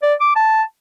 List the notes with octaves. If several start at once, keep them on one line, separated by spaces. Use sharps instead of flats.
D5
D6
A5